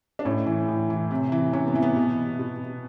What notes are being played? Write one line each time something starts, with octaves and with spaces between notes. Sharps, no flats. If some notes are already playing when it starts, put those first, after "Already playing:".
D4
A2 C#4
E3
A2
E3
C3
E3
C3 C#4
B3
E3
B3
B2
B2